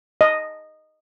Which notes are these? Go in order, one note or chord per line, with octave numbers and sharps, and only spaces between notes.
D#5